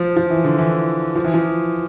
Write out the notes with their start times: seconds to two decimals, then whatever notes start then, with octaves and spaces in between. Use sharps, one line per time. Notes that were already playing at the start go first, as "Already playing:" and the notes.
Already playing: F3
0.17 F3
0.30 E3
0.44 D3
0.58 E3
1.15 F3
1.24 E3
1.34 F3